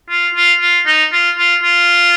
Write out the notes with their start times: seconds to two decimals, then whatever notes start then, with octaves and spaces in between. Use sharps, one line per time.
0.09 F4
0.35 F4
0.61 F4
0.86 D#4
1.12 F4
1.38 F4
1.63 F4